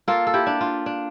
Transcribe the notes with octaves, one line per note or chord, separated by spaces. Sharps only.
A#3 F4 A4
A4
E4 G4
D4
F4
D4